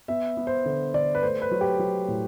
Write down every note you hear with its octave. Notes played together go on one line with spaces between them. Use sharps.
B3 E5
B3
C5
D3
D3 D5
B4
A3 C5
B4
F#3
G4
F#3
A2